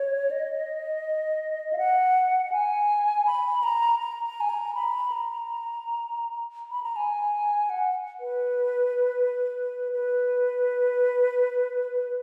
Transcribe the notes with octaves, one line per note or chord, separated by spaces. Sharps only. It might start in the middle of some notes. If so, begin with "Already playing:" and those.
Already playing: C#5
D#5
F5
F#5
F#5
G#5
B5
A#5
A#5
A#5
G#5
A#5
B5
A#5
B5
A#5
G#5
F#5
B4
B4